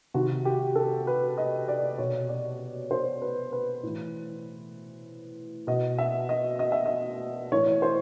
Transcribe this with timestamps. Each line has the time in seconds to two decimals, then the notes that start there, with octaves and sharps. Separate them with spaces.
0.14 C3 D#3 F#4
0.45 G4
0.75 A4
1.07 B4
1.38 D#5
1.68 D5
1.98 B2 C#5
2.29 D5
2.91 C5
3.22 B4
3.52 B4
3.83 A2 E3
5.67 B2 D#5
5.98 E5
6.29 D#5
6.59 D#5
6.72 E5
6.86 D#5
7.52 A2 E3 C#5
7.82 C5